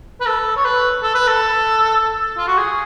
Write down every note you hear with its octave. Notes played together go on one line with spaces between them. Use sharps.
B4
A4
C#5
B4
A4
B4
A4
F4
F#4
G#4